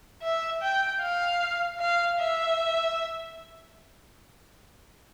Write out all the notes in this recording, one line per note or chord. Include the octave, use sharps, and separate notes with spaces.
E5
G5
F5
F5
E5